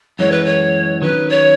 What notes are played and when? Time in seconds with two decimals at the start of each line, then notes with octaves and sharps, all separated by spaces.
0.19 F#2 E3 G#3 C#5
0.31 B4
0.44 C#5
1.01 D#3 F#3 C#4 B4
1.29 C#5